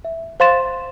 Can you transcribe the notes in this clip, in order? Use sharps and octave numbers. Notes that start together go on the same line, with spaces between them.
E5
C5 F5 C6 A6 E7